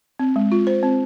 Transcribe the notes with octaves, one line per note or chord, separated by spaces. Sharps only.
C4
G#3
F4
C5
C4